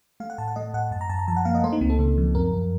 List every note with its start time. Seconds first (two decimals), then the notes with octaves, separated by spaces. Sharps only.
0.20 A3 F5
0.30 F#5
0.38 A2 A5
0.48 F#5
0.56 A3 D#5
0.74 A2 F#5
0.91 F#2 A5
1.01 A#5
1.09 F#2 A5
1.19 A#5
1.28 F3 A5
1.37 F#5
1.45 A#3 F5
1.55 D#5
1.64 A3 C5
1.72 D#4
1.81 C#2 C4
1.90 A4
1.99 C#3
2.18 F3
2.35 F#2 A#4
2.53 F#2